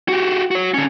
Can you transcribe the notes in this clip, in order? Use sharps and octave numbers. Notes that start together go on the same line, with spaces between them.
F#4 G4
F#4 C#5
D3 C#4